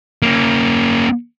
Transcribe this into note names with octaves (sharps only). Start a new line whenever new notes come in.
A#3 C#4